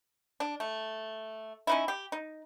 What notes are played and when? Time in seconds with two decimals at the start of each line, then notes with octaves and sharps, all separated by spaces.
0.40 D4
0.60 A3
1.67 C#4 D#4 E4
1.88 G4
2.12 D#4